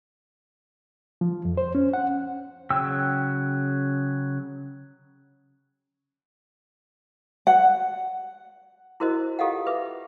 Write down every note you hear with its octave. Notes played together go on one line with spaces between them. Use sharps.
F3
F2
C5
C#4
F#5
C#3 F#3 G5 E6
F#5
E4 F#4 A#4 C5 D#5
F4 G4 A4 D#5 F5 F#5
B4 E5 D6